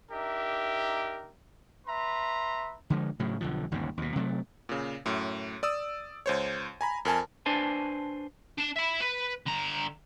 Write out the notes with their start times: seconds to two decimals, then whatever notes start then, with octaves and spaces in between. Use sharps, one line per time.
0.11 D4 D#4 G4 A#4 E5
1.87 B4 E5 A#5 C6
2.90 D3 F3 G#3
3.19 A2 C#3 F#3
3.41 B1 D3 F3
3.71 G1 D#2 G#2 C#3
3.97 D#2 B2
4.16 C3 F#3 G3 A3
4.69 A#2 C#3
5.06 F#2 A2
5.63 D5 D#6 E6
6.26 C#2 C5 C#5
6.81 G#5 A#5 B5
7.05 F2 A#4 G#5 A5
7.46 D4 B4 C5 G#5 A5
8.58 D4 A5
8.76 E5 B5
9.01 B4
9.46 D3 A#5